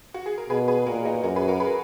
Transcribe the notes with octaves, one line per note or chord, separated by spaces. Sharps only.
F#4
G#4
A#4
B2 G#4 B4
G#4 B4
A#2 F#4 A#4
D#4 F#4
F#2 F#4 A#4
G#4 B4
F#4 A#4
G#4 B4